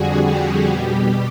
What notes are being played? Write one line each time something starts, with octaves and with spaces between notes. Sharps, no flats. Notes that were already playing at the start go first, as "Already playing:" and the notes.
Already playing: F2 D3 G3 F#4 G#4
G4
B2 G3